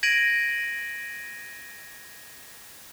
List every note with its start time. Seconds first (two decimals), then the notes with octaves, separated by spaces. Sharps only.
0.03 G#6 A#6 D7 D#7 F#7